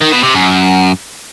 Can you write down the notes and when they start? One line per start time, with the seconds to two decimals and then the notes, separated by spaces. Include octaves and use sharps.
0.01 D#3
0.12 B2
0.23 C3
0.34 F#2